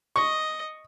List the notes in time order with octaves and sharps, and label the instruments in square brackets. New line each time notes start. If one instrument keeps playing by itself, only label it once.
[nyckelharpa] D#5 [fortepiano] C#6